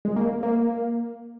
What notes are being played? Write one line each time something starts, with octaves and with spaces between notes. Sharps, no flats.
G#3
A#3
A#3